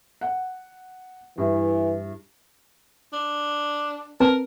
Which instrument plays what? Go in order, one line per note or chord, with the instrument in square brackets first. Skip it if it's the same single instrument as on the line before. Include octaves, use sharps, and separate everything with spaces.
[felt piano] F#5
[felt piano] G2 E4 [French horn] E3
[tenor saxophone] D4
[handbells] C4 B4 A5 [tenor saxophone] A#4